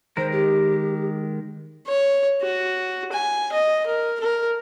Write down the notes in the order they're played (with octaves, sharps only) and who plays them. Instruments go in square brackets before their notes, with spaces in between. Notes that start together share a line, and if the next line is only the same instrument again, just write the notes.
[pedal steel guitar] D#3 G#3 A#4 [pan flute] C5
[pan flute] G4
[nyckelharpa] C#5
F#4
G#5
D#5
A#4
A#4